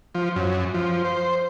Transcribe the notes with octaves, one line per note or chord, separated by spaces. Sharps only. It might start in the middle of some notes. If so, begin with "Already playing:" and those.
F3
F#2
F3
C5